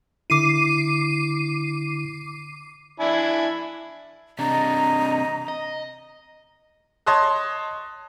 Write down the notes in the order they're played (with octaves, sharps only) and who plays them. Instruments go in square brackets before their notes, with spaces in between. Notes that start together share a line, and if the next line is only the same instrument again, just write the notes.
[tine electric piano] D3 E4 [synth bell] D6 C7 D#7
[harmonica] D4 E4 G#5
[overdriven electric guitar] C3 D4 [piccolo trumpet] D#5 [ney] A#5
[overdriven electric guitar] D#5
[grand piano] C#5 D#5 A5 C6 D#6 F#6